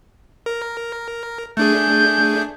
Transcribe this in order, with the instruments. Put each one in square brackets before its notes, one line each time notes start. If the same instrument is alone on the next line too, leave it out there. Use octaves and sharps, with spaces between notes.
[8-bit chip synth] A#4
[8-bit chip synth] A3 D4 G#4 [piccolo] G6